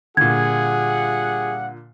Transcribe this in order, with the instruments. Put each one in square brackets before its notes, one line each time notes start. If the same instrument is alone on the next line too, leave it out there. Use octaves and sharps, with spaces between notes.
[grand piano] A#2 D3 [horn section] G3 F4 F#5 [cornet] G#4 [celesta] G#6